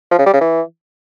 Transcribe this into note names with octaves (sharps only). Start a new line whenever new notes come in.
F3
C#3
G3
C#3
E3